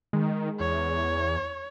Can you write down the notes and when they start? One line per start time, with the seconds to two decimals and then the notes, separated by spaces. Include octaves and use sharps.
0.13 D#3 G#3
0.60 E2 C#5